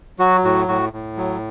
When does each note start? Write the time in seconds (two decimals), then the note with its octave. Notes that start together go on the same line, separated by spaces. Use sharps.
0.19 F#3 F#4
0.44 A2 F#4
0.68 A2 F#4
0.93 A2
1.17 F#3